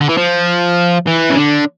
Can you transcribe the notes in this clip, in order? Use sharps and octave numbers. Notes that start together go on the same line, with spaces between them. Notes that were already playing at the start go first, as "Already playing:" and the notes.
D3
E3
F3
E3
C#3
D3